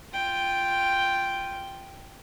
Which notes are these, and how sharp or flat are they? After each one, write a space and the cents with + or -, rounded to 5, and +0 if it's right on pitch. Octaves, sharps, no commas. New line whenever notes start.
F4 +0 G5 +0